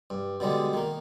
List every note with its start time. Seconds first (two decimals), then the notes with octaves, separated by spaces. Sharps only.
0.10 G2
0.40 B2 D3 G3 G#3
0.73 D#3 A#3